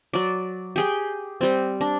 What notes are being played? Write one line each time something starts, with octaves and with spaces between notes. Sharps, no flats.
F#3 D5
G4 G#4 G5
G3 C4
D4